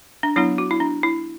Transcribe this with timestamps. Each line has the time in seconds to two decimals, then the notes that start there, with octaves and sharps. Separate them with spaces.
0.23 D4
0.36 F#3 B3 D4 E4
0.58 F#4
0.71 E4
0.80 D4
1.03 E4